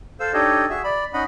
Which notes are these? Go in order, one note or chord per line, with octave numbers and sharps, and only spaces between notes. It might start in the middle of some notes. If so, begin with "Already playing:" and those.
A4 C5 F5 E6
D4 D#4 G4 A4 C#5 D#5
F#4 G#4 E5
D5 B5
C#4 D#4 D#5 F#5 B5